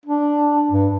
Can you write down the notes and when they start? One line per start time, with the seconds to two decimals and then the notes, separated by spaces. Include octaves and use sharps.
0.06 D4
0.71 G2